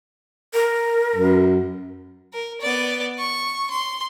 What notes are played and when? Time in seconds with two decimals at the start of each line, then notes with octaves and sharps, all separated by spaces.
0.54 A#4
1.16 F#2
2.33 A#4
2.61 B3 D5
3.19 C#6
3.70 C6